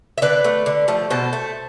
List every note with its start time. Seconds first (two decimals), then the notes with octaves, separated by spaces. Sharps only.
0.18 E5
0.22 D3 B4 D5
0.44 A3
0.66 D3
0.88 F3 A3
1.10 B2 A4 C5
1.33 A3